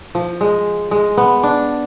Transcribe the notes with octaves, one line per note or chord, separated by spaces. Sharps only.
F3
G#3
G#3
B3
D4